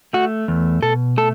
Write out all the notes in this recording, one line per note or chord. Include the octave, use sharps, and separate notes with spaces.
A3 F#4
E2
B2 A4
A3 A4